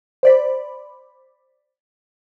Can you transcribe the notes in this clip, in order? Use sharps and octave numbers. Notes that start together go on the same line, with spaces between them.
C5 D5 B5